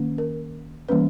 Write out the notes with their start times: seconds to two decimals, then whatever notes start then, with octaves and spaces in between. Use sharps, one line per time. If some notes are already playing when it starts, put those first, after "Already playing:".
Already playing: D#3 A#3 C#4
0.18 A#4
0.89 E3 G3 A#3 C#4 B4